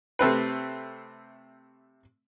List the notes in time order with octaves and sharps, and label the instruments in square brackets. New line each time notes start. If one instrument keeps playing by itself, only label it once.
[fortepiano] C3 A3 C4 B4